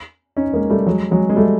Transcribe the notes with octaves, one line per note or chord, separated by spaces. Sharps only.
C#4 D#4
G#3 A#3
G3 A3
F#3 G#3
F#3 G#3
G#3
G3 A3